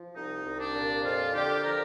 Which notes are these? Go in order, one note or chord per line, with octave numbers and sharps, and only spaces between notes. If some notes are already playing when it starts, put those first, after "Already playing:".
Already playing: F3
C2 D#4
C2
D4
A#2
F2 F4
D3 G4
F3 A#4